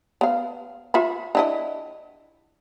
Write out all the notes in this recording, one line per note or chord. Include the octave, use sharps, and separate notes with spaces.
B3 F5
F4 E5 B5
D4 E4 D#5